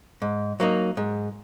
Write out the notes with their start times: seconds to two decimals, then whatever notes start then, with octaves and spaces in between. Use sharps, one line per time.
0.22 G#2
0.60 F#3 A#3 D#4
0.97 G#2